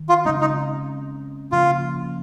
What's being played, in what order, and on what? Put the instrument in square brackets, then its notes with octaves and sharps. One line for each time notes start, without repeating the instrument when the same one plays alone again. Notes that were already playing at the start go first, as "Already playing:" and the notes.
Already playing: [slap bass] D#3
[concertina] F4
[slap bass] C#3 G#3 C4 [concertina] D#4
[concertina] D#4
[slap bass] C#3 F3 A#3 [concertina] F4